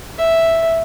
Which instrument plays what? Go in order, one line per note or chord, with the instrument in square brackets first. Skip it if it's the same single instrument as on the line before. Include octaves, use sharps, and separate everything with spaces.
[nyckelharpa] E5